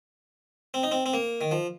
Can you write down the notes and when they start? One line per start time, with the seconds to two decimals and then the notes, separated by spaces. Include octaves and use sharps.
0.74 C4
0.83 D#4
0.92 C4
1.06 C4
1.14 A#3
1.41 D#3
1.51 F3